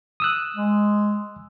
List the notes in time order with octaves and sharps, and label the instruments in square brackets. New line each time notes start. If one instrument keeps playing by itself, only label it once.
[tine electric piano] D#6 E6 F#6
[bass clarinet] G#3